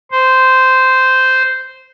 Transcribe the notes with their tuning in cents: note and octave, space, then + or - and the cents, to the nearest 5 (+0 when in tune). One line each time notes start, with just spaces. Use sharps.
C5 -10